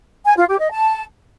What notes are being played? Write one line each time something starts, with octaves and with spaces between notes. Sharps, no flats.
G#5
F4
G4
D#5
A5